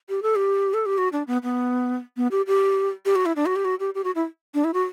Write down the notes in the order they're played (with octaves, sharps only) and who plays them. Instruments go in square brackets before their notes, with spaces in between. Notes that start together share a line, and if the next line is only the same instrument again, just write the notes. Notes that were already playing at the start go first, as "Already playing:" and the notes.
[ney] G4
A4
G4
A4
G4
F#4
D4
B3
B3
B3
G4
G4
G4
F#4
E4
D4
F#4
G4
F#4
G4
G4
F#4
E4
D4
E4
F#4